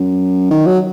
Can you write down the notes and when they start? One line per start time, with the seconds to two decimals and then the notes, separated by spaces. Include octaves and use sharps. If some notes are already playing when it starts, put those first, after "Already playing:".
Already playing: F#2
0.51 D#3
0.67 F#3